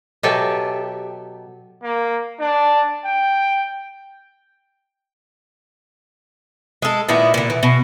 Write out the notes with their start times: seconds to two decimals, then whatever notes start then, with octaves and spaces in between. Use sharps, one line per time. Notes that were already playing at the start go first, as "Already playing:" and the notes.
0.23 B2 F#3 G4 A4 E5 G#5
1.83 A#3
2.40 D4
3.06 G5
6.82 G#3 A4
7.09 A#2 D#3 B3 E4
7.34 A#2 D3
7.50 E3
7.63 B2